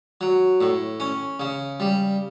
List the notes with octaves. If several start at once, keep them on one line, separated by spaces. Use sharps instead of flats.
F#3
A2
C#4
C#3
G3